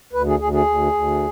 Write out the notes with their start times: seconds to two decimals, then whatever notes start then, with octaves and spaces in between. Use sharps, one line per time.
0.13 D2 B4
0.26 G#4
0.39 D2 G#4
0.53 G#4
0.66 D2
0.92 D2